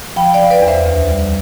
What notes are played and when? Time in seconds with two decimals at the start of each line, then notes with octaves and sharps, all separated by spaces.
0.16 F3 G5 B5
0.34 D5 F5
0.40 F3
0.50 B4 D5
0.62 E2
0.68 C5 E5
0.86 D2
1.09 G3